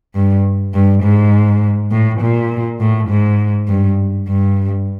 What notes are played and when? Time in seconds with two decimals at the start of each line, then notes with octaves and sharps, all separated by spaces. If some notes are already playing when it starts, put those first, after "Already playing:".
0.15 G2
0.74 G2
1.03 G#2
1.91 A2
2.21 A#2
2.80 A2
3.09 G#2
3.68 G2
4.28 G2